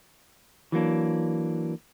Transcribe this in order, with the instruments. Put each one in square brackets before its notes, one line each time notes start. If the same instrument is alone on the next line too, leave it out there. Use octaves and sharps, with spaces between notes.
[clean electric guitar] E3 F#3 A#3 D4